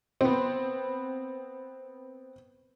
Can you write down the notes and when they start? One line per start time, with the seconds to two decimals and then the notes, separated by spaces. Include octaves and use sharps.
0.21 B3 C4